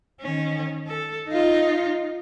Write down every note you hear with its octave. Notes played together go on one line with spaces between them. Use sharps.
D#3 C#4
A4
D#4 F4